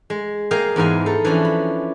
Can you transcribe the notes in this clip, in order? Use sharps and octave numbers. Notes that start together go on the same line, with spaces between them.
G#3
A#3 G#4 D#5 F5 G5
E2 G#2 B4 F5 G#5
D#4 A4
E3 F3 C#4 D4
B5